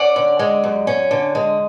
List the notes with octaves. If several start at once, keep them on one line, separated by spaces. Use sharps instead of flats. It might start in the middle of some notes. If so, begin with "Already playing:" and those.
Already playing: C#4 D5 F#5
D3
G#3
F#2
C#4
D3
G#3